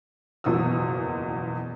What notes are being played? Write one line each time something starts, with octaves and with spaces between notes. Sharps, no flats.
F#1 E2 B2 F3 D#6 E6